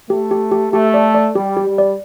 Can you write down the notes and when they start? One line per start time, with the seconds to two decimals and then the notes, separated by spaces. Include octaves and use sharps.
0.09 A3 G4
0.31 G4
0.52 G4
0.72 A3 G4
0.94 D5
1.14 D5
1.35 G3 G4
1.57 G4
1.67 G3
1.78 D5